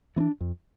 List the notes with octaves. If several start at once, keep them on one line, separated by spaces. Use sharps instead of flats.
E3 B3 D4
F2